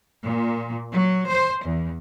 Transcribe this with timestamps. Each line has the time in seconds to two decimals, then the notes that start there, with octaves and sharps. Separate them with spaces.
0.22 A#2
0.90 F#3
1.29 C5
1.66 E2